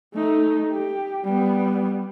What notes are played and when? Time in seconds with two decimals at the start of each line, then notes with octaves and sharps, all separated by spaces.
0.14 A3 D#4
0.72 G4
1.24 G3 B3